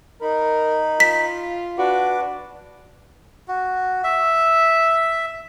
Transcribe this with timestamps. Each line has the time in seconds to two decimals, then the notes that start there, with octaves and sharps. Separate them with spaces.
0.22 D#4 A#4 B5
1.00 F4 B6
1.78 D4 F#4 B4 D6
3.48 F#4
4.04 E5